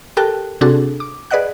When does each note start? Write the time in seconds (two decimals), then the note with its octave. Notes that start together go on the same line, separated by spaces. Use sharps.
0.17 G4 A4 A#4 G5 A5 F#6
0.61 C3 C4 D4 F#4 G#4 A4
1.00 D6
1.31 G#4 B4 D5 D#5 F#5 F#6